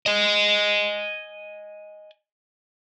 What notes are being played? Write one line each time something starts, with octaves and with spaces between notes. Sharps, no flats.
D#5 G#5